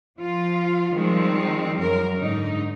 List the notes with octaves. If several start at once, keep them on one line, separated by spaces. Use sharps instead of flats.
F3 F4
D#3 F3 G3 G#3 C4
F#2 A#4
G#2 D3 D#4